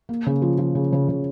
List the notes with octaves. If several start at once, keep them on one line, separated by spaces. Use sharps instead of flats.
A#3
C#3
F3
F3
C#3
C#3
C#3